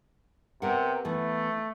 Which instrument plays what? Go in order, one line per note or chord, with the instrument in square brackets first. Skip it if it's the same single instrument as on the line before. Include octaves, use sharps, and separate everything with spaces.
[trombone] C3 [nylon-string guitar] B3 A#4 F#5
[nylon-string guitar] E3 B3 [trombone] A3